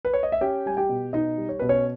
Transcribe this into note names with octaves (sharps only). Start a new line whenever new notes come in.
B4
C#5
D#5
E5
C#4 G4 G5
G3 G#5
G4 G5
B2
B2 D#4 D#5
G3
C#5
B2 B4
C#4 C#5